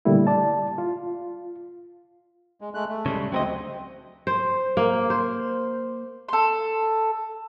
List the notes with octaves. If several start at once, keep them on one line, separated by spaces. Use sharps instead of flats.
A#2 D3 G3 A3 A#3 E4
D5 A5
F4
G#3
G#3 A3 F#6
A3
C#3 G3 G#3
D2 F#3 C4 A#4 D#5
C5
A#3
C5
A4 C6